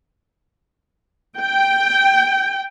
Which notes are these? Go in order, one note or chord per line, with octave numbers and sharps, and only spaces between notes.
G5